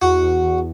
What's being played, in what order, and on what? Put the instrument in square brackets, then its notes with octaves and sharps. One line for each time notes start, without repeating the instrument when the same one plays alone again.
[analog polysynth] E2 [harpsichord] F#4
[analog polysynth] E2
E2